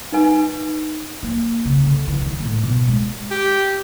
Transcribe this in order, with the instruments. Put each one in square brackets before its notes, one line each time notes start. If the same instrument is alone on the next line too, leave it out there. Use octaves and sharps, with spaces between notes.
[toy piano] D#4 B4 G#5
[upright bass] A#3
C#3
D3
E3
D#3
A2
B2
G#3
[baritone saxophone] G4